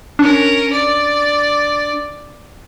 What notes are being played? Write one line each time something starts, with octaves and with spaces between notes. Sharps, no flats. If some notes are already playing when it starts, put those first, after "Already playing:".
C#4 D4 A#4
D5